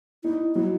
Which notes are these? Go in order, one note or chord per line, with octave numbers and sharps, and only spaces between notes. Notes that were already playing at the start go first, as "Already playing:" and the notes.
D#4 E4
F#3 E4